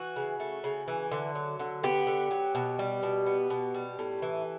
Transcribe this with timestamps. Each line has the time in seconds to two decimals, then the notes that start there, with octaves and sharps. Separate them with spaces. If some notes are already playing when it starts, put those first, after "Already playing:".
Already playing: E3 F#4
0.16 C#3
0.40 A3
0.64 C#3
0.88 E3
1.12 D3
1.35 F#3
1.59 D3
1.83 B3 G4
2.07 D3
2.31 F#3
2.55 B2
2.79 G3
3.03 B2
3.26 B3
3.50 B2
3.75 G3
3.99 A2
4.22 E3